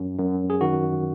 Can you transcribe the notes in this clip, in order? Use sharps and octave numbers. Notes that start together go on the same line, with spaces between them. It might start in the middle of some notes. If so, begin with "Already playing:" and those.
Already playing: F#2
F#2
G#4
D#3 F#4